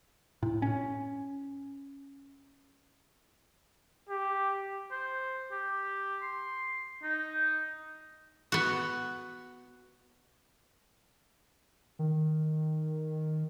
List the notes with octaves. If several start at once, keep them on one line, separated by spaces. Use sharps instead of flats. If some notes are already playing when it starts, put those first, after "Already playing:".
A2
C#4
G4
C5
G4
C6
D#4
B3 F#4
D#3